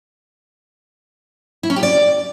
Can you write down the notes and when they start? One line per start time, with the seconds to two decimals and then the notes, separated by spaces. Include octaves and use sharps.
1.63 E4
1.70 C#4
1.76 G4
1.83 D5